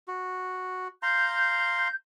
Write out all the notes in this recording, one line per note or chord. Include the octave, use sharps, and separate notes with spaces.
F#4
F5 A#5 C6 G6